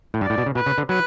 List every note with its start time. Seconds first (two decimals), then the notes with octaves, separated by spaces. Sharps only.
0.14 A2
0.21 G2 D5
0.30 A2
0.38 B2
0.46 C#3
0.55 B2 B4
0.66 C#3
0.78 D3
0.89 F#3 B4